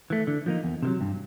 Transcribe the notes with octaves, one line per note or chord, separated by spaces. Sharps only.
E3 A3
D3
F3 A#3 D#4
E2
C3 D#3 F#3
G2